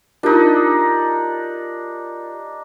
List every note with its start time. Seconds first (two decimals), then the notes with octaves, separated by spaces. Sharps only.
0.23 D4 D#4 F4 G4 A#4